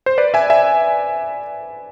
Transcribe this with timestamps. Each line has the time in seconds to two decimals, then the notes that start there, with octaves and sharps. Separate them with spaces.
0.06 C5
0.18 B4 D5
0.34 E5 G#5
0.50 E5 G#5